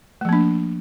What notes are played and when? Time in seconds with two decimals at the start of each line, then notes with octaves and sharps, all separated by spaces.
0.21 A3
0.25 F3
0.29 A#3
0.33 D4